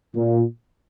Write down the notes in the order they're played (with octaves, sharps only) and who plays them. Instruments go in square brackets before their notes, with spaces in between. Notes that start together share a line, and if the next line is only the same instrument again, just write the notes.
[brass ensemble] A#2